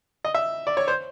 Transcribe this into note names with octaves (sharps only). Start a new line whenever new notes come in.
D#5
E5
D5
C#5
C5